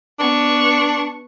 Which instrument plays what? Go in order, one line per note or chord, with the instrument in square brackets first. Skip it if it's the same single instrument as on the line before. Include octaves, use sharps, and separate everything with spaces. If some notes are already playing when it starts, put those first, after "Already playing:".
[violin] B3 C#6 [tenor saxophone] D4